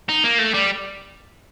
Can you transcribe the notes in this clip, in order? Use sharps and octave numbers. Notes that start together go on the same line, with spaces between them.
D#4
A#3
A3
G3